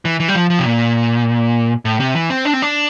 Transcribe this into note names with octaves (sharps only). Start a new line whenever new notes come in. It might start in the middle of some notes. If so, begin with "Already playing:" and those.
E3
E3
G3
F3
F3
C3
A#2
A2
C3
E3
C4
D4
C4
D4